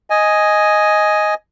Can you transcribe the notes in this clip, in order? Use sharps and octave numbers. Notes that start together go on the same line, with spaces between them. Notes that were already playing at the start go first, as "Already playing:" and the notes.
D#5 G#5